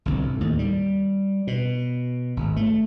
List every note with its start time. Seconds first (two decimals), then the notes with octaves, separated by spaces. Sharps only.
0.05 G1 C2
0.37 D#2 A2
0.59 G3
1.47 B2
2.37 G#1
2.56 A3